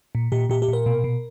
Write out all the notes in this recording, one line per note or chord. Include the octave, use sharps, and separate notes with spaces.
A#2
A#2 G4
A#2 G4
G4
A#2 A#4
B2
B2